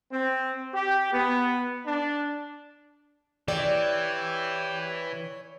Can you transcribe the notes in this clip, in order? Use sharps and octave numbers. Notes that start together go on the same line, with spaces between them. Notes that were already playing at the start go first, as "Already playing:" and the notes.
C4
G4
B3
D4
E3 G4 C#5 D5 G5